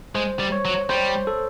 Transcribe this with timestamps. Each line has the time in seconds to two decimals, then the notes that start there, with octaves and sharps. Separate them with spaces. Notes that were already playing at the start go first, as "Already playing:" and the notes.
0.15 G#3 C5
0.39 G3
0.52 C#5
0.65 F#3
0.89 G3 C5
1.27 A4